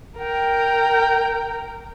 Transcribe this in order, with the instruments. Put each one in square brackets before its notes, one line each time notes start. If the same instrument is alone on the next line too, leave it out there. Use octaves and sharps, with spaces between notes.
[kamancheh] A#4 G5